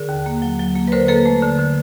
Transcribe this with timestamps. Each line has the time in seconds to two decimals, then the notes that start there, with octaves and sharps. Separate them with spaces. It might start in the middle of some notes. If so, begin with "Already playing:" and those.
Already playing: D3 G#4 A#4
0.09 D#2
0.26 A#3
0.42 F#3
0.59 F#3
0.75 A#3
0.88 B4
0.92 D3 A#4 C5
1.08 A#3 A4 B4
1.26 A3
1.42 D3
1.59 D3